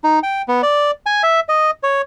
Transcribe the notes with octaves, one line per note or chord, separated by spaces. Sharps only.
D#4
G5
B3
D5
G#5
E5
D#5
C#5